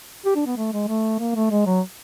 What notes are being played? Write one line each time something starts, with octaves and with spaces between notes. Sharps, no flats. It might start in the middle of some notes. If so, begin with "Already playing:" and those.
G4
D4
B3
A3
G#3
A3
A#3
A3
G#3
F#3